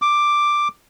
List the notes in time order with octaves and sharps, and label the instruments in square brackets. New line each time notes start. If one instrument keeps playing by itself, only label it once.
[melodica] D6